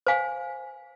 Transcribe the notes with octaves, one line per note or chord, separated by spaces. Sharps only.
C5 F5 G#5